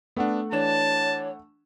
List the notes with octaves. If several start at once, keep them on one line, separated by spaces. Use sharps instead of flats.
A3 B3 D4 F#5
E3 D4 C#5 A5 E7